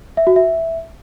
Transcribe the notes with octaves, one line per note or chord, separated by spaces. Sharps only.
E5
F#4
E5